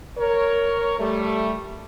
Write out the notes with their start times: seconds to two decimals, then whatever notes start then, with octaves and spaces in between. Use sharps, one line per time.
0.18 A#4 C#5
0.99 G3 A3